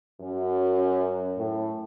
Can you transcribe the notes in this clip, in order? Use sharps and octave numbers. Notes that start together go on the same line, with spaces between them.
F#2
A2